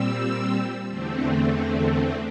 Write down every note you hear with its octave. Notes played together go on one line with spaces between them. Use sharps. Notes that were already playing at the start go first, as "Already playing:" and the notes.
Already playing: A#2 G3 C4 E6
E2 D3 A3 C4